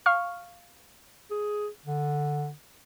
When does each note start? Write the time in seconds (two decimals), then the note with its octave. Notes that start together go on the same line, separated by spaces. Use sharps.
0.06 F5 C#6 F6
1.31 G#4
1.85 D3